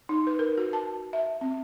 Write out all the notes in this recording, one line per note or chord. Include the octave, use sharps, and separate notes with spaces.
D#4
B4
A#4
F#4
A5
E5
C4